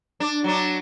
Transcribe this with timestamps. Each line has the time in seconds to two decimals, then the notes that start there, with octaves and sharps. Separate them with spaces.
0.20 D4
0.44 F#3 D4